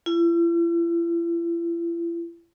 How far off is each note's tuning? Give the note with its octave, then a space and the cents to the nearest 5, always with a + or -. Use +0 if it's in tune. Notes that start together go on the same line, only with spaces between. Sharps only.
E4 +45